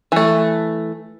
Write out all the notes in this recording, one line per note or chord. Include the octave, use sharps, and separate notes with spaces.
E3 A3